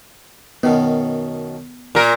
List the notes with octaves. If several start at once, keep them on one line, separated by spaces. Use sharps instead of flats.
F#2 B2 D#3 B3
A#2 A#4